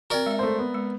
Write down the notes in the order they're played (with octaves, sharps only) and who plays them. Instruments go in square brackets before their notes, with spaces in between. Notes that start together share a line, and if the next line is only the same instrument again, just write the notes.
[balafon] C4 F#4 [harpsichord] A#4 D5
[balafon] G#3 E5
[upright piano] A3 C5
B3
[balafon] G#3